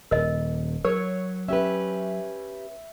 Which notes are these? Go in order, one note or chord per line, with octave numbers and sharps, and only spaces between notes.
D#1 A#4 D#5
F#3 A#4 C#5
C#4 G4 B4 E5